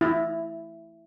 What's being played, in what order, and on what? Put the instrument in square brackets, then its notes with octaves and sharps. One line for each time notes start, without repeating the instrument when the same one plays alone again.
[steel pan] E4